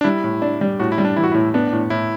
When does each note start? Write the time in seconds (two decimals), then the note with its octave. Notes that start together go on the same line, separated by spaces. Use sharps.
0.01 D4
0.04 G3 E4
0.24 A2
0.42 D4
0.61 G3
0.79 A2 F#4
0.92 E4
0.98 G3
1.05 D4
1.16 E3 E4
1.24 F#4
1.32 A2 E4
1.54 B3 D4
1.73 A2
1.90 A2 E4